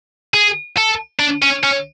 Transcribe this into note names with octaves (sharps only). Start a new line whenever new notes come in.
G#4
A4
D4
C#4
C#4